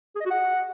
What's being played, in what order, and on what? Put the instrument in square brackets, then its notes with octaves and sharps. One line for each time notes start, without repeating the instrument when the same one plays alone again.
[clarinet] G#4
D#5
F#4
F#5